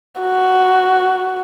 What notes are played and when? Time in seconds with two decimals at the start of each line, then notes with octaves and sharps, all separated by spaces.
0.21 F#4